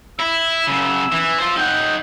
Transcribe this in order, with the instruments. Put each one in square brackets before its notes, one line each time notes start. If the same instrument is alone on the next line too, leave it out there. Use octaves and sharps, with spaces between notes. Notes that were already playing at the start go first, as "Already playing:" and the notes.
[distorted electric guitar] E4 [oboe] E6
[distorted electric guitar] F#2 C#3
E3
F4 C5
[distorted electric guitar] D#4 F#5 [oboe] G5